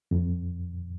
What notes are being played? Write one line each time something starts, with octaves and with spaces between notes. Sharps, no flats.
F2